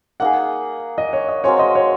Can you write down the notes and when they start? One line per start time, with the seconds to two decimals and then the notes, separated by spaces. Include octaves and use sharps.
0.20 A#3 D#4 G#4 F#5
0.98 D#5
1.13 C#5
1.29 D#5
1.44 G#3 C4 F#4 A#4 C#5
1.59 D#5
1.75 C#5